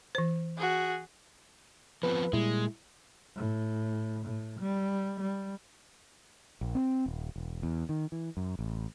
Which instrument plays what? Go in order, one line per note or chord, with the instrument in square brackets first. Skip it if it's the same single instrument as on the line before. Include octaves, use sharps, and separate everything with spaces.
[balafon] E3 C5
[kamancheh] F#4 G#4
[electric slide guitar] F3 B3 C4 [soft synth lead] B4
[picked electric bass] A#2 G3 [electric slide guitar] G#3 [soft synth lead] E4
[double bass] A2
A2
G3
G3
[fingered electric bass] A#1
C4
D#1
E1
E2
D#3
E3
F#2
A1